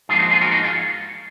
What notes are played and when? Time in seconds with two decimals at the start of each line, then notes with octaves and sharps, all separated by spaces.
0.09 G#2 F3 A#3 F4 G#4
0.19 D#4 F#4
0.30 F4 G#4
0.41 F#4 A#4
0.51 D#4 F#4
0.63 F4 G#4